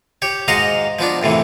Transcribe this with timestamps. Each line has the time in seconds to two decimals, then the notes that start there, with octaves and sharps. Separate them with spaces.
0.22 G4 C#5
0.48 G#2 F#4 D#5 F5 A#5 C6
0.99 F3 B3 D4
1.22 F#2 A2 C3 E3